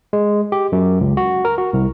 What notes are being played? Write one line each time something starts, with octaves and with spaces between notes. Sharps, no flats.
G#3
G4
F#2
C#2
F#4
A#4
F#4
C2